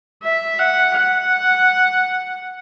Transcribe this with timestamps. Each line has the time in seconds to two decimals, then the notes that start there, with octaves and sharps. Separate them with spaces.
0.23 E5
0.59 F#5
0.95 F#5